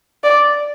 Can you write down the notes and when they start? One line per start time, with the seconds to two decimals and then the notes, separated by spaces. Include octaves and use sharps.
0.24 D5